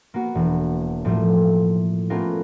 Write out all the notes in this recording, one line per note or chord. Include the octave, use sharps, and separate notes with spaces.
A#3 B3 F#4
E1
A2 F3 G3 A3 A#3
A3 B3 C#4 F4 G4 A#4